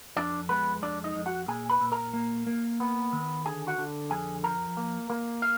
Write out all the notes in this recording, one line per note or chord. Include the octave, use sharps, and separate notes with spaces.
F2 D4 D5
G#3 B3 B4
F2 D4 D5
D#4 D#5
F2
F#4 F#5
A#2 G#4 G#5
B4 B5
A#2
A#4 A#5
A#3
A#3
B3
D#3
D3 G#4 G#5
F#4 F#5
D3
F2 G#4 G#5
F3 A#4 A#5
A#3
A#3
F5